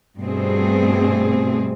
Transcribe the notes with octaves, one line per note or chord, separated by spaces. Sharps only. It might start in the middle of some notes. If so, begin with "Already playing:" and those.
G2 B2 A3 C4 G#4